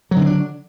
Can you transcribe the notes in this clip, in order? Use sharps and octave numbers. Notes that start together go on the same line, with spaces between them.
D3 F#3 C4 D4